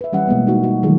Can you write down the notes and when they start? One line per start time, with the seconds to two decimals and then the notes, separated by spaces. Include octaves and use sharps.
0.01 B4 E5
0.13 E3 G3 C#4 F#5
0.27 B2 G#3 A#3 B3
0.47 D#4 F#4
0.63 G3 F#4
0.83 D#3 E3 F#3 A3 F4 G#4